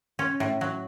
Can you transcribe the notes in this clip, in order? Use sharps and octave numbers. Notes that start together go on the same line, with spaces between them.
C#4
A2
F#3